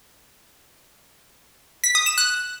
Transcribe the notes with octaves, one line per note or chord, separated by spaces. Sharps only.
B6
D#6
E7
F#6